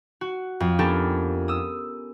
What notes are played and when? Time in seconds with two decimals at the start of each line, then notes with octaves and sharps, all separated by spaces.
0.21 F#4
0.60 F2
0.79 B3 C#4 D4 G4 A4 A#4
1.48 D#6 E6